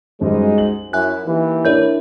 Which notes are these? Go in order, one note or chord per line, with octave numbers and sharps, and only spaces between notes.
F#2 G3 G#3 D#4 F#4 C5
F#7
F#2 E4 E5 G#5 F#6
E3 A#3 D#4 G4
D4 E4 A#4 C#5 D5 G6